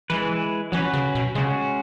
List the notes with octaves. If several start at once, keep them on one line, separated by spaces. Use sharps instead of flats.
E3 G#3 E4 B4
E3 F#3 C#4 F#4 B4
C#3
B2
C#3 G#3 C#4 F#4